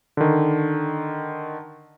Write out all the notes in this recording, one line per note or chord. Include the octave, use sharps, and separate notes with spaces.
D3 D#3